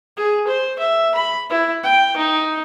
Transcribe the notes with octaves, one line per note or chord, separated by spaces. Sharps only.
G#4
C5
E5
B5
E4
G5
D#4